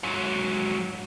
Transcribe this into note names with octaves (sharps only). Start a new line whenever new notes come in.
G#2 F#3